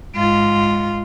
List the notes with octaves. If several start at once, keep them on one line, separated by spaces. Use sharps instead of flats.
G#2 F4